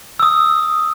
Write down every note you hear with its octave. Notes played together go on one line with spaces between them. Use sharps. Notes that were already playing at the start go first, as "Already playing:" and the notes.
D#6 E6